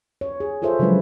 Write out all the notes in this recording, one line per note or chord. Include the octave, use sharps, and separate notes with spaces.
C#5
G#4
F4 G#4 A4 C5 C#5 E5
C#3 F3 F#3 G#3 D4 B4